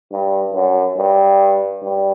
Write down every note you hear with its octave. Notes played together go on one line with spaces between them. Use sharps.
G2
F#2
G2
G2